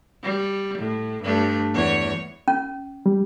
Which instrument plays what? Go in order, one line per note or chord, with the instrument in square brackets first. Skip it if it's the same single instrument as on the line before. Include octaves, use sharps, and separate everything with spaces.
[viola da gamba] G3
A2
G2 A3 D4
E2 C#5
[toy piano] C#4
[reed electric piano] G3